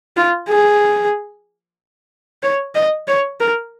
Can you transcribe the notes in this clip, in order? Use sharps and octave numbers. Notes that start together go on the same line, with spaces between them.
F4
G#4
C#5
D#5
C#5
A#4